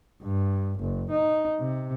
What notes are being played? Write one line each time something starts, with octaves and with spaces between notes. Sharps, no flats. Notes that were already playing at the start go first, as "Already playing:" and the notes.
G2
F#1
D#4
C3